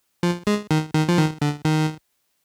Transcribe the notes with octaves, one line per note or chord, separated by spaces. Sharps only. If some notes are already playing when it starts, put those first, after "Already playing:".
F3
G#3
D#3
D#3
F3
D#3
D3
D#3